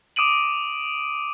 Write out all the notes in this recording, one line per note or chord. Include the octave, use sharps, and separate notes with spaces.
D6 D#6 D7 D#7 F#7